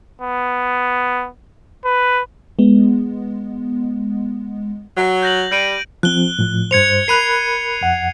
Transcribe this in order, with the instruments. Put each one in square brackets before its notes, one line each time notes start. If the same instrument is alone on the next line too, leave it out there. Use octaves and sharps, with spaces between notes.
[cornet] B3
B4
[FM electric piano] G#3 B3
[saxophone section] F#3
[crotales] G6 A#6 F#7
[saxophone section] G3 [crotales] G6 D7 D#7
[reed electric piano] F3 C4 [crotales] F#6 G7
[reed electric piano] A2 F3
[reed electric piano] G2 C5 [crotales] G#6 C#7 F7
[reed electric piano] A#4 B5 F#6 [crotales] C7 D#7 F7
[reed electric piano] F2 F#5